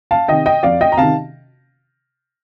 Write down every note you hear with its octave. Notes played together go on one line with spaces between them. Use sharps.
F5 A5
C3 D#3 D#5 G5
D#5 G5
F2 D5 F5
D#5 G5
A#5
C3 D#3 F5 A5